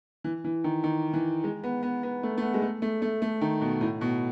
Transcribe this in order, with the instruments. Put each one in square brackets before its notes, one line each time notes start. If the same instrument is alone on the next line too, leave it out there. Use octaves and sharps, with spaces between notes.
[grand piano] E3
E3
D#3
D#3
E3
G#3
B3
B3
B3
A3
A3
B3
G#3
A3
A3
A3
A3
D#3
B2
A2
B2